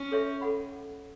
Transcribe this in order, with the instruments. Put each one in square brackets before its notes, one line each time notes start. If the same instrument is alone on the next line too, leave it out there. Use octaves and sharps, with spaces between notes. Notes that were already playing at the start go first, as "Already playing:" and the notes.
Already playing: [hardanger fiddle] C#4
[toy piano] A4 C#5 E5 C#6
A4 F#5 B5